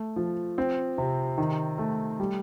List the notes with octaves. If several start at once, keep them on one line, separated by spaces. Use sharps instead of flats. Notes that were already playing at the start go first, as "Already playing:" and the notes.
Already playing: A3
F3
C4
C3
D#3
A3
G3